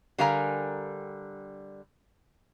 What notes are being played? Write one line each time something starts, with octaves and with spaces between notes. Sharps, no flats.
D3 G3 A#4 F5 G#5 A#5